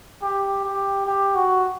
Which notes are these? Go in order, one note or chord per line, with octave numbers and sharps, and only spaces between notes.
G4
G4
G4
F#4